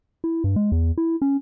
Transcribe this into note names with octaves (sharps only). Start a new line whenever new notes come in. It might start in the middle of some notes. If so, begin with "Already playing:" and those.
E4
G2
G#3
E2
E4
C#4